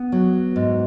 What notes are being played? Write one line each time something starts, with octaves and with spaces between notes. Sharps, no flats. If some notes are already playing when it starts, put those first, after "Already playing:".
Already playing: B3
F#3
G#2